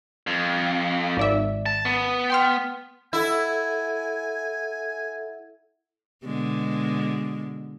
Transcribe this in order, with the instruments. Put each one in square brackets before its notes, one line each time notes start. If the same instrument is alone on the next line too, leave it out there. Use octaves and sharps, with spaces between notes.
[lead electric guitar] F2
[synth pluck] G#1 D5 E5
[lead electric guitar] A5
B3
[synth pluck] G5 C6 F6
[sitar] E4 [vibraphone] A4 E5 F#5 [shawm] G#5
[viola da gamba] B2 D3 G#3